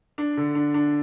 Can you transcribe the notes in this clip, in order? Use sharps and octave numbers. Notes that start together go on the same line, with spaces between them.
D4
D3
D4
D4